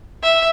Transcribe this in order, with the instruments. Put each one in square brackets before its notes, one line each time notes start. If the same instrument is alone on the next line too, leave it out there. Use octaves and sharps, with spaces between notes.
[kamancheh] E5